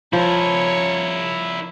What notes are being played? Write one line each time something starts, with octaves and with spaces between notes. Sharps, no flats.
F3 E4 A#4 C#5